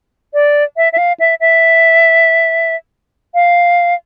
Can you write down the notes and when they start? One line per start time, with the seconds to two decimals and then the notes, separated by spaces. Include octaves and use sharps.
0.34 D5
0.77 E5
0.93 E5
0.98 F5
1.19 E5
1.40 E5
3.34 F5